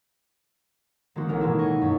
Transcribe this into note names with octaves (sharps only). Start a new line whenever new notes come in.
D#3 G#3 A#3 C4 F#4
A1 C#4 A#4
B2 G#3 A#3 D#4 E4
D#5 G#5 C#6
F#2